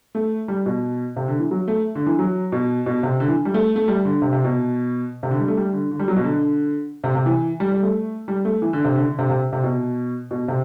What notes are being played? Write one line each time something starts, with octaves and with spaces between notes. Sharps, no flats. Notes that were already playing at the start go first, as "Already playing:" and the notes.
A3
G3
B2
C3
D3
E3
F#3
A3
D3
E3
F#3
B2
B2
C3
D3
E3
G3
A3
A3
G3
D3
C3
C3
B2
C3
D3
G3
A3
G3
D3
D3
G3
F#3
B2
D3
C3
C3
E3
G3
G3
A3
G3
A3
E3
D3
C3
D3
D3
C3
C3
C3
B2
B2
C3